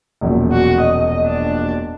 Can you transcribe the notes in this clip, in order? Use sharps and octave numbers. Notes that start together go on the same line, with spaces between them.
E1 A#1 F#2
F#4
D#5
D4